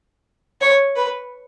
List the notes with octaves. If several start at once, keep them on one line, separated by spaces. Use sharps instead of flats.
C#5
B4